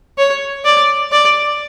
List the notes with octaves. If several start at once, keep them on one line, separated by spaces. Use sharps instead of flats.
C#5
D5
D5